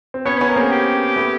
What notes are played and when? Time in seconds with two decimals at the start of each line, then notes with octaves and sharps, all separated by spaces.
0.14 C4
0.25 B3 C#4 C#5
0.38 B3 C#4 B4
0.48 A#4
0.56 A#3 C4 G#4
0.71 G4
1.16 A3 B3